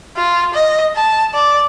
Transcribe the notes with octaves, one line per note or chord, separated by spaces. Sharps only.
F4
D#5
A5
D5